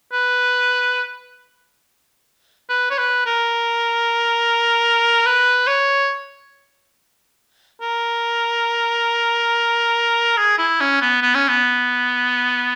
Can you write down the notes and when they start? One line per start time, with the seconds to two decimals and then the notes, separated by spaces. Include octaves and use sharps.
0.12 B4
2.69 B4
2.90 C#5
2.98 B4
3.26 A#4
5.26 B4
5.67 C#5
7.81 A#4
10.37 G#4
10.58 E4
10.80 C#4
11.01 B3
11.22 B3
11.34 C#4
11.48 B3